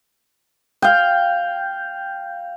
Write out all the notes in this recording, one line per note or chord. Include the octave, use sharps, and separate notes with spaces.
F5 G5